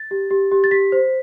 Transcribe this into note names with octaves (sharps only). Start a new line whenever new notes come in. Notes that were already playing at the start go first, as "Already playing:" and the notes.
Already playing: A6
G4
G4
G4
A6
G4 B6
C5